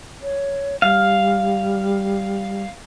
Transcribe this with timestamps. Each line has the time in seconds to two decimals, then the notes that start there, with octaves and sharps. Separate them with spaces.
0.23 C#5
0.82 G3 F5